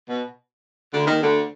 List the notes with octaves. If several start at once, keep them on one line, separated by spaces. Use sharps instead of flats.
B2
D2 D3
D#2 D#3
D2 D3